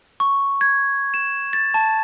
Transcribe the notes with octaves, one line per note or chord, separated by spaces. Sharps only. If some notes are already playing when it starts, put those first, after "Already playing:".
C#6
G#6
E7
A6
A5